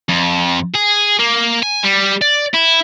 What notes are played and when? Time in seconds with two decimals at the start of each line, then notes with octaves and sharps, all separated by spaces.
0.09 F2
0.74 G#4
1.19 A#3
1.63 G#5
1.84 G3
2.22 D5
2.54 E4